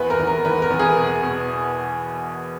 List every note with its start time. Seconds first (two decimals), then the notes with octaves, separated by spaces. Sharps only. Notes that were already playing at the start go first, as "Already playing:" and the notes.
Already playing: E2 B4
0.10 A#4
0.19 E2
0.27 A#4
0.45 E2 B4
0.62 A#4
0.70 E2
0.79 G#4
0.96 B2
1.23 B2